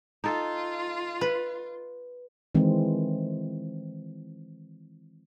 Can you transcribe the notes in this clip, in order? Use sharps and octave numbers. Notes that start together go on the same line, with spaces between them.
D#4 F4 A4
B4
D#3 E3 G#3 C4